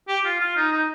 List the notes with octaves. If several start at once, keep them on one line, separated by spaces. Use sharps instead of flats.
G4
F4
F4
D#4
D#4